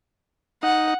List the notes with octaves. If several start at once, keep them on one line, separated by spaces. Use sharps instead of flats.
D#4 F#5